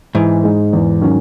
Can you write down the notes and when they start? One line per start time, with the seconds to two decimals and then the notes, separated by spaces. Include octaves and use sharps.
0.15 G#2 E3
0.44 G#3 D#4
0.73 E2
1.01 D#3 F#3 C#4